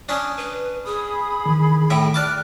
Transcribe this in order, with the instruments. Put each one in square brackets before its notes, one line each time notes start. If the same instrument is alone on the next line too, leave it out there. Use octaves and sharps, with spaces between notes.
[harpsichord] C#4 D4 [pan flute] D#6
[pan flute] B4
[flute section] G#4 B5 [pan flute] D#6
[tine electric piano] D#3 E3
[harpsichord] A2 E5 [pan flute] G5
[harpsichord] D5 A5 D6 [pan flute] F6 [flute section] F#6